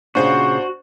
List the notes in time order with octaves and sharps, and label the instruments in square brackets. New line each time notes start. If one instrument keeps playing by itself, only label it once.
[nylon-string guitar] A#2 C#3 [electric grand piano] D4 C5 [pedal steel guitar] F#4 [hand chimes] C#6